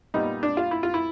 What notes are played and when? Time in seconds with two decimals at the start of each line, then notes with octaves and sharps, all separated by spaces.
0.14 A#2 G3 B3 D#4
0.43 D4
0.57 F4
0.71 E4
0.83 F4
0.94 E4